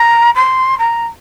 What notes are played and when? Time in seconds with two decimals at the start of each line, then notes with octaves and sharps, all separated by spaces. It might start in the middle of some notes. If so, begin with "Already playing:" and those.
Already playing: A#5
0.35 C6
0.78 A#5